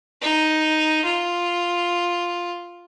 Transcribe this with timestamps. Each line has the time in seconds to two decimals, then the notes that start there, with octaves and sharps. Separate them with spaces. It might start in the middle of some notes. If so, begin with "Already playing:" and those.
0.22 D#4
1.05 F4